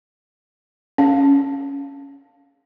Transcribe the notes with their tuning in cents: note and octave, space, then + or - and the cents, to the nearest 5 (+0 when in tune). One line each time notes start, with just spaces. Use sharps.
C#4 +0 F5 +0